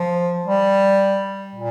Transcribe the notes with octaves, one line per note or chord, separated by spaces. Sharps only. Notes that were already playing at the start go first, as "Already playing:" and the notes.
Already playing: F3
G3
A#2